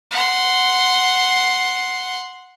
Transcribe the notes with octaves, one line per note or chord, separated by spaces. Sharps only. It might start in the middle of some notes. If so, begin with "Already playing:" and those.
F#5 C6